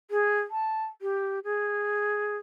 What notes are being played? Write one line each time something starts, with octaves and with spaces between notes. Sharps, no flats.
G#4
A5
G4
G#4